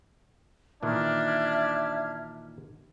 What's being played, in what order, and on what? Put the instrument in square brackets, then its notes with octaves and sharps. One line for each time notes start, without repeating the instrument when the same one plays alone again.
[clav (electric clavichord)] A#2 D#3 E3 [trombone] D4 [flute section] E5 F6 G#6